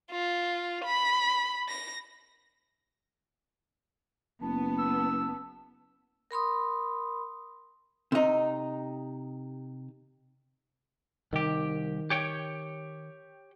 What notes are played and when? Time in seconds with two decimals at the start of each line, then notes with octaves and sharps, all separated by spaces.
0.12 F4
0.85 B5
1.69 A#6
4.42 F#1 B3 A5
4.79 E6
6.31 A#4 B5 C6 D#6
8.12 C3 D#4
11.33 C2 D#3 G4
12.10 G4 C#5 G5